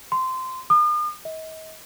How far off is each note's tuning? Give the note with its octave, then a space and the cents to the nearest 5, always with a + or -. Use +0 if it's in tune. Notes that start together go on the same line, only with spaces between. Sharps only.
C6 -15
D#6 -45
D#5 +40